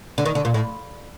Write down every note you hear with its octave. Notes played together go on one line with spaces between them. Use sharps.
D3
D#3
D3
A#2
A2